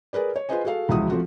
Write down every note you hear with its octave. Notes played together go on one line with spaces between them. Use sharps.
G#4 A#4 B4 D5
C#5
F4 G#4 B4 C5 D#5 G#5
F#4 G#4 A4 F5
E1 C#2 F3 E4 F#4 D#6
F3 A3 C4 F4 F#4